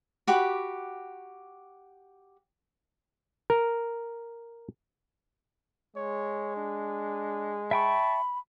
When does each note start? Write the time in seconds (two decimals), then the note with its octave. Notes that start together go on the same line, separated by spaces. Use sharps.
0.27 F#4 G4 B5 D6
3.50 A#4
5.96 G#3 C#5
6.57 D4
7.71 E5 G5 A5 B5 C#6